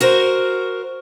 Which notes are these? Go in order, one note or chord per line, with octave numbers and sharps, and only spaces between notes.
F#4 A#4 C5